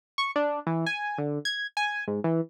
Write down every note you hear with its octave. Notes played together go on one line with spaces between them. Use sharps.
C#6
D4
E3
G#5
D3
G#6
G#5
G#2
E3